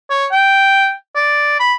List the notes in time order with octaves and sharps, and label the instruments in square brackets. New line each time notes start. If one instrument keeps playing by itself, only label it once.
[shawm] C#5
G5
D5
B5